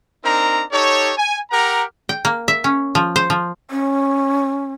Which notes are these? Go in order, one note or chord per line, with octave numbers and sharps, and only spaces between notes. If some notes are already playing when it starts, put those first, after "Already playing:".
C4 D4 D#4 A#4 A#5
D#4 G4 A4 C#5
G#5
G4 A#4 F#5 A#5
G5
A#3
E5
C#4
F3
C5
F3
C#4